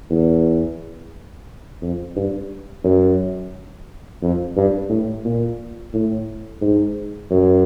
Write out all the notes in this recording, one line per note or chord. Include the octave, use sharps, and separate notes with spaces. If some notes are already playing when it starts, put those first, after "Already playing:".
E2
F2
G2
F#2
F2
G2
A2
A#2
A2
G#2
F#2